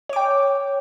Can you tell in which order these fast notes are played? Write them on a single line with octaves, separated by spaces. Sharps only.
C#5 D6 G5